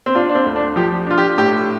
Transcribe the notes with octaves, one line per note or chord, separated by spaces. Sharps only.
C4
D4 F4
D4
C4
D2
D4
F3 G4
D4 F4
G4
A2 G4